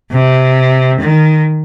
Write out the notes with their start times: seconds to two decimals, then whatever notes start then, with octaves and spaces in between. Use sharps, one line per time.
0.12 C3
1.00 D#3